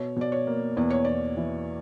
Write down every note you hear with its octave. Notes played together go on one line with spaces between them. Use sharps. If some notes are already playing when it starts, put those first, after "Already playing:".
Already playing: B2 C#5
B2 D5
C#5
A#3
E2 D5
C#5
E2 D5
E3